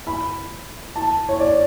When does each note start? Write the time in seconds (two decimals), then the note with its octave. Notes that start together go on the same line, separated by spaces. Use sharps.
0.07 B5
0.96 A5
1.29 C#5
1.40 D5